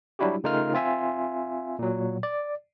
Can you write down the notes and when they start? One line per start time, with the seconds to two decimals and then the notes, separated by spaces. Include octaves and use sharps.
0.19 F#3 G3 D4 E4 F#4 G4
0.44 C#3 A3 D#4 F4 A#4 F6
0.73 C4 F4 E5 G#5
1.79 A#2 F#3
2.23 D5